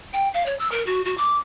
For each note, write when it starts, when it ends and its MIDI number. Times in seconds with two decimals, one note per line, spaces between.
0.13 0.28 79
0.34 0.43 77
0.46 0.55 73
0.59 0.70 88
0.71 0.85 70
0.86 1.03 66
1.05 1.14 66
1.17 1.38 86